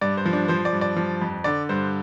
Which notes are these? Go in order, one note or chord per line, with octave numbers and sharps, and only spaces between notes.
G2 D5
C5
F3
D4
F3 C5
D5
G2
D5
F3
F2
D3 D5
G2 C5